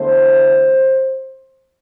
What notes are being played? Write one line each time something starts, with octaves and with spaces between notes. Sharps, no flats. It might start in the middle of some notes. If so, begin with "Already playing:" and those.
Already playing: E2 D3 A3 C5